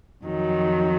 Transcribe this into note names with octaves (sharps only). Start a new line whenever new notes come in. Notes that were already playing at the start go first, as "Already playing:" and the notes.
F2 D#3 F#3